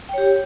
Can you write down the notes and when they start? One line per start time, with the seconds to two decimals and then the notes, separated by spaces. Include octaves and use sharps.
0.09 G5
0.13 C#5
0.18 G4